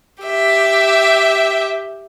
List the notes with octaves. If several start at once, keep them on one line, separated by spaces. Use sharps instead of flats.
G4 E5